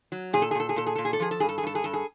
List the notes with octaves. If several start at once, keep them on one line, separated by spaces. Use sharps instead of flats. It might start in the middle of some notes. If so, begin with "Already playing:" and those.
F#3
A#2 G#4
A4
G#4
A#2 A4
G#4
A#2 A4
G#4
A#2 A4
G#4
A4
F3 G#4
A4
G2 G#4
A4
G#4
G2 A4
G#4
G2 A4
G#4